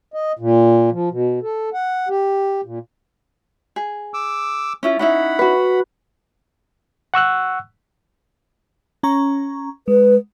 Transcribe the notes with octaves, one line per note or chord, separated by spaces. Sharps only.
D#5
A#2
F3
B2
A4
F#5
G4
A#2
G#4
D6 E6
C#4 E4 F4
C#4 D#4 E4 F#5 B5
F#4 B4
F#5 C#6 E6 F#6
C#4 A#5 C#6
G#3 B4